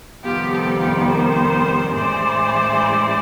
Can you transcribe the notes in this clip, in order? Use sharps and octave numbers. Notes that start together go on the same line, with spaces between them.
F2 C3 D#3 G3 B3 F4 G4
G4 A4
F4 G4
A#4 C5
A2 E3 G#3 C#4 E4 C5 D5